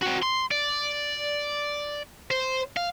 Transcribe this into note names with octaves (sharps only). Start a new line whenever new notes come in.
C4 F#4
C6
D5
C5
F5